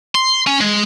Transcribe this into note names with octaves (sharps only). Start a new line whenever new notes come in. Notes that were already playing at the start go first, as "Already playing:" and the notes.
C6
C#4
G#3